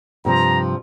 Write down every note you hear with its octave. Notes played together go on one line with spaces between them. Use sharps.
G2 C3 F3 A#5